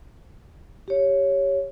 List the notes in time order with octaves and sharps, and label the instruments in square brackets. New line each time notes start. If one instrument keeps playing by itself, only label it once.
[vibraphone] G4 C#5